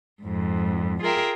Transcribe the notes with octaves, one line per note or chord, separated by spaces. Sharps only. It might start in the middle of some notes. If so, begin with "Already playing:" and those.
F2 G#2
F4 G#4 A#4 E5 G5